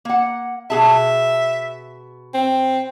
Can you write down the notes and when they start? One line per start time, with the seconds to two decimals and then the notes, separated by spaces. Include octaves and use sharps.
0.05 A#3 F#5
0.70 B2 G#4 E5 A5
2.34 C4